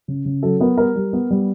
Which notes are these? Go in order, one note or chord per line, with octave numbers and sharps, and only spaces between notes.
C#3
C#3
F#3 A4
B3 A#4
G3 A#4
G3
B3
G3